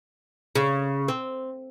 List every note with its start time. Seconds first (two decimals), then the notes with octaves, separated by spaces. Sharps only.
0.55 C#3
1.08 C4